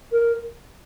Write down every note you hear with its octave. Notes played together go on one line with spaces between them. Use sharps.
A#4